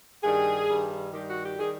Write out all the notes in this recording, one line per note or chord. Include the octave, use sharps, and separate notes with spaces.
G2 D#3 G3 G#4
G2 D#3 G3
G2 D#3 G3 G4
F#4
G4
D#3 G3 G#4